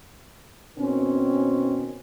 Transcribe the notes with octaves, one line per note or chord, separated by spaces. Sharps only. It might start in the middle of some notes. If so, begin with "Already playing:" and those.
B2 D#3 C4 C#4